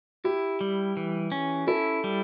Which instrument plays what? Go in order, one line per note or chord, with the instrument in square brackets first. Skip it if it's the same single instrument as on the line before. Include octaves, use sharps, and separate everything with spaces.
[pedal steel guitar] E4 [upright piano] G4
[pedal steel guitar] G3
E3
C#4
[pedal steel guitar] E4 [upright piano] A4
[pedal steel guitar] G3